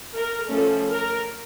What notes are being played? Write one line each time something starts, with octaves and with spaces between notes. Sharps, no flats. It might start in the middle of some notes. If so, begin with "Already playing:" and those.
A#4
F3 A3 C#4 A4
A#4